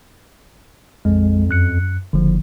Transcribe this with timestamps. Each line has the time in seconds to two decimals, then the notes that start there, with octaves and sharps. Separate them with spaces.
1.05 A#1 F2 G#3
1.49 F#2 F#6 C#7
2.13 F#1 D3 F3